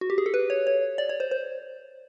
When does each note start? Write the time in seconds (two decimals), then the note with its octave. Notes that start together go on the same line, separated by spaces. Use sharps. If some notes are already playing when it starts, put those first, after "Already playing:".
0.01 F#4
0.10 G4
0.18 G#4
0.26 A4
0.34 B4
0.50 C#5
0.67 C#5
0.98 D5
1.09 C#5
1.20 C5
1.31 C5